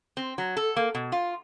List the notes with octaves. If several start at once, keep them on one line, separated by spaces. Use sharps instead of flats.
C4
F#3
A4
A#3
B2
F4